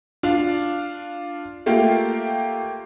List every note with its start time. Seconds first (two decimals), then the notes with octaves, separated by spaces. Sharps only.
0.23 D4 F4 F5
1.66 A3 A#3 F4 G4